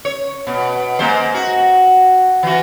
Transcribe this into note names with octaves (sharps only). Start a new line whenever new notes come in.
C#5
B2
G#3 A#3 C5
F#4
E3 F4 F#4